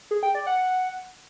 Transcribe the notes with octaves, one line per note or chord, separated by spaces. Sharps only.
G#4
G5
D5
F#5